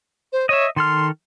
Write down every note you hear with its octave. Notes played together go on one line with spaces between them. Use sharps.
C5
C#5 D#5 E5
D#3 A4 C6 F6